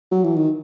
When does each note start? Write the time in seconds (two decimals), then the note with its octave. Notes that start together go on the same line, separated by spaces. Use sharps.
0.11 F#3
0.24 E3
0.36 D#3